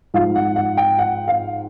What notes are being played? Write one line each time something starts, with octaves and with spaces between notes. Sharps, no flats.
G#2 F3 F5
F#5
F#5
G5
F#5
F5